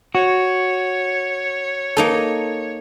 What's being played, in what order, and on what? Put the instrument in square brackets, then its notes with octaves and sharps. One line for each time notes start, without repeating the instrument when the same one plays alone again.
[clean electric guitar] F#4 [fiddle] C#5
[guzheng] A#3 D#4 A4